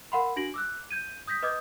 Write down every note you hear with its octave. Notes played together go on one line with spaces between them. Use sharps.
A#4 F5 F#5 B5 C6
D4 F#4 A#6 D7 F#7
D6 E6 F#6
G6 G#6 D#7
D#6 G6 A#6 B6
B4 D#5 D6 D#6 G6 G#6